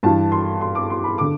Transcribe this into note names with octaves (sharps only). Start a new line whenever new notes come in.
G2 E3 A5
C6
C6
D6
C6
B5
D3 D6